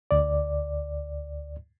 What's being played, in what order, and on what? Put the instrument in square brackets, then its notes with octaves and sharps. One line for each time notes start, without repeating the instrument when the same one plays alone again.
[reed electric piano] D2 D5